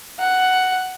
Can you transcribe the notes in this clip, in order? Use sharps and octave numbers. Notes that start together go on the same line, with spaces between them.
F#5